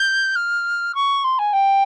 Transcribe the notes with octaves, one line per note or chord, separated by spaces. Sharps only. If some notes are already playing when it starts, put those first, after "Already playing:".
Already playing: G6
F6
C#6
C6
G#5
G5